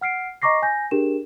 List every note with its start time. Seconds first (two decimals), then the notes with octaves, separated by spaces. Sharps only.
0.01 F#5 F6 C7 D7
0.42 D#5 A#5 C#6 D6 A#6 C7
0.62 G#5 G6 A#6
0.91 D4 G4 G#4 A#4 E7